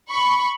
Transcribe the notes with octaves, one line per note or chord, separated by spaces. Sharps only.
B5 C#6